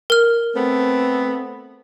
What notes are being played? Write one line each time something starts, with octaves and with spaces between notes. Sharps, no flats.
A#4 F6
A3 B3 C4